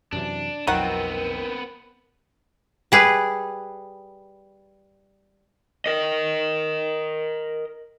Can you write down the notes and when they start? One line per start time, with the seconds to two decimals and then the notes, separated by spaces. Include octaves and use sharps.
0.12 F#2 C3 E3 D4
0.67 B1 F2 D#3 F#3 B3 C4 A#4 F#5
2.92 G3 G#4 B4
5.86 A#4 D#5